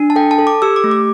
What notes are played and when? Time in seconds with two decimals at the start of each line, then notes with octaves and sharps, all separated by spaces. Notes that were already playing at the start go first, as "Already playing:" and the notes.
Already playing: D4
0.10 A5
0.16 A4 G5
0.31 A5
0.39 A4
0.47 D6
0.62 G4 E6
0.76 D6
0.84 A3
0.91 D6